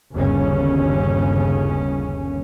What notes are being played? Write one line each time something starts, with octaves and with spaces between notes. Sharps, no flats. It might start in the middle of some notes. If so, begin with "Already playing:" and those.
G1 D#2 C#3 C#4